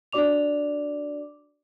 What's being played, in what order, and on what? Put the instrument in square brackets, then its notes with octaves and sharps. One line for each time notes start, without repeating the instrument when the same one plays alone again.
[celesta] D4 F#4 D5 D6 F7